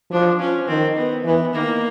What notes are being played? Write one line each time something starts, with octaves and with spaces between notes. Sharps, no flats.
F3 D4
C#4
D#3 C4
B3
E3 B3
D#3 A#3